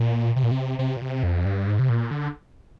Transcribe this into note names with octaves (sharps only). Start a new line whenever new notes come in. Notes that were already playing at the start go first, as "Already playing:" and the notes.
Already playing: A#2
C3
A#2
C3
C3
A#2
C3
F2
G2
G#2
C3
A#2
D3